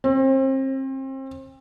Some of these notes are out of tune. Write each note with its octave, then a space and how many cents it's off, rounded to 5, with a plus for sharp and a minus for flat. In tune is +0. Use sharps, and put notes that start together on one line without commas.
C4 +35